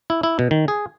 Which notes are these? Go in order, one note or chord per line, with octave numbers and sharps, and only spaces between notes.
E4
E4
B2
D#3
G#4